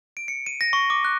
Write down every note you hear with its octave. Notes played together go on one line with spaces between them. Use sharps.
D7
C#7
D#7
A#6
C#6
D6
F#6